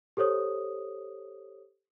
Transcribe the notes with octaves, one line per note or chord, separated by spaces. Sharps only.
G4 A4 C5 C#5 D#6